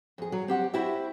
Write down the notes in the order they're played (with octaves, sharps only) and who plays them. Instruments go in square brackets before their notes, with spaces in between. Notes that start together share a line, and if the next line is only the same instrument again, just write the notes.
[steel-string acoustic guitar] F2 G#4
F#3
C4 G4 F#5
E4 F#4 G4 C5 E5